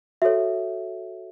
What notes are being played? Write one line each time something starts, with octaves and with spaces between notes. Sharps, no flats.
F#4 A4 C#5 E5